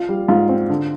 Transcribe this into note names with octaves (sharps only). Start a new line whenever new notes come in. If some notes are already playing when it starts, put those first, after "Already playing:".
Already playing: F4 F5
G3
G#2 F4 F5
C4
D3